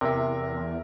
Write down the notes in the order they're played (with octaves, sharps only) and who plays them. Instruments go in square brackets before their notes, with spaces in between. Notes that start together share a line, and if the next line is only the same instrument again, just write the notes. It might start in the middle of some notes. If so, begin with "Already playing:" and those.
[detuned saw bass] E2 [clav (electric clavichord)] C3 [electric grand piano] A#4 E5